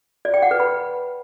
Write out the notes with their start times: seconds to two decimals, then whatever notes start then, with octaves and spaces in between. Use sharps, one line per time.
0.25 D5
0.34 G5
0.42 F#5
0.51 B4
0.60 B5